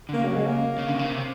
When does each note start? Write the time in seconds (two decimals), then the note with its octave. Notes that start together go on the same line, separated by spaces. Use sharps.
0.09 D3
0.13 C#3 A#3
0.24 F#3
0.35 G#3
0.45 A#3
0.78 C#3
0.88 D3
0.94 C3
0.99 C#3
1.10 C3